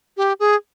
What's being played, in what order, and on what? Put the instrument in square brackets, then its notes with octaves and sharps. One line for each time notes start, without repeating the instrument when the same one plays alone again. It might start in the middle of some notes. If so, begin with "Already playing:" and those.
[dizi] G4
G#4